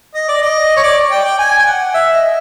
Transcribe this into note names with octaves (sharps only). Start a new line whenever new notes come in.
D#5
D5
D#5
C#5
D5
G5
G5
G#5
G5
F#5
E5
D#5